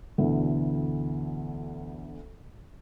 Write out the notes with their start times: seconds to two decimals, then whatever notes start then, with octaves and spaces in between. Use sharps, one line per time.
0.18 D2 B2 D3 E3